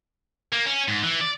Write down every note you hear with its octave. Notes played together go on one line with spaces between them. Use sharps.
A#3
C#4
G#2
E3
D5